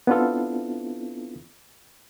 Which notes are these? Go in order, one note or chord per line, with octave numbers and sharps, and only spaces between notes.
B3 C4 D4 E4 F4 A4